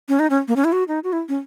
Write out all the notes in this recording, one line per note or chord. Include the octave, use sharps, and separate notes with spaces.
C#4
D#4
C#4
A#3
C#4
E4
F#4
D#4
F#4
E4
C#4